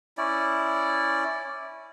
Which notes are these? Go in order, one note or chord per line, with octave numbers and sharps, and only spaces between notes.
C#4 E4 D5